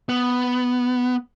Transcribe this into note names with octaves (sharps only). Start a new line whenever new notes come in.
B3